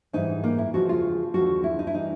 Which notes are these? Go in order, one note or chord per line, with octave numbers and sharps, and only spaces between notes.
G#2 E3 G3 D#4
A#3
E4
E2 C#3 F3 G#3 F#4
F4
D#2 D3 F3 G#3 F#4
E4
D#4
E4
E3 G3 D#4